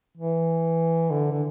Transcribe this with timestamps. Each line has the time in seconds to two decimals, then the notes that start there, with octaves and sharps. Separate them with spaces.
0.17 E3
1.10 D3
1.32 D3